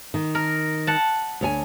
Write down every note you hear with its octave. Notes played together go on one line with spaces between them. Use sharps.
D#3
A#4
F#5 A5
D2 C#5 G#5